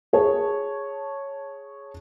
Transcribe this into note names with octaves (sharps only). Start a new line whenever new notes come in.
G#4 C#5 A5